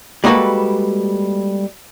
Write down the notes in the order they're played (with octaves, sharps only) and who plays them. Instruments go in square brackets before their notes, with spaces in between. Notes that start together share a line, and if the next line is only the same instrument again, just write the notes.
[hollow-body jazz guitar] G3 G#3 A#3 F#4 A4 B4